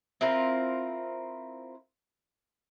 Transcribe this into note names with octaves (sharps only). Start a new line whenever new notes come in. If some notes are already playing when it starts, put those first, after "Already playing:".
C4 E4 F4 A#4